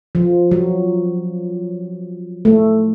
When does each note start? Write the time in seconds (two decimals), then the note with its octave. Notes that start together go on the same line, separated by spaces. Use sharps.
0.15 F3
0.51 F#3
2.45 A3